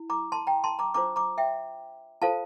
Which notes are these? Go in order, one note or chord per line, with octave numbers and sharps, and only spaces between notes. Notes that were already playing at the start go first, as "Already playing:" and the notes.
Already playing: E4
A#5 D6
A5 C6
G5 A#5
A5 C6
A#5 D6
D4 F4 C5 A#5 D6
A#5 D6
E5 G5
F4 A4 C5 F5 A5